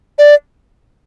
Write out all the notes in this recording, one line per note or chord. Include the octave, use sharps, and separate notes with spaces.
D5